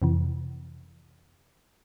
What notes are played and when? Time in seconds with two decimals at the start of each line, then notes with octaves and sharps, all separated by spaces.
0.02 F2 C3 E3